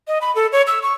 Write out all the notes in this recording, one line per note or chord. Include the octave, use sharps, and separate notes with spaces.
D#5
B5
A4
C#5
E6
C#6